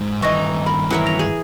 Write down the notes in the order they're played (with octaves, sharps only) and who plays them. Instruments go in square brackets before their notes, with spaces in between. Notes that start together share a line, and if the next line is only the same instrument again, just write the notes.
[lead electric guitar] G#2
[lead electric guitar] G2 D#3 [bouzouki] E3 D#4 [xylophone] C#6 A#6
[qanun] A#4 [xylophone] B5
[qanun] E3 A#4 E5 [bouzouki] F#3
[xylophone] A#6 F7
[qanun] G#4